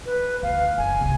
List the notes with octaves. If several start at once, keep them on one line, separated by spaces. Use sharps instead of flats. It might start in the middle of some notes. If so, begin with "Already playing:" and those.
B4
D2 F5
F#1 G#5
C2 G2